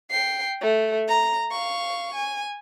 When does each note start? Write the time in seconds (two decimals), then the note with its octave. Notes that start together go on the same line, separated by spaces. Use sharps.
0.11 G5 C7
0.61 A3
1.08 A#5
1.51 F5 C#6
2.15 G#5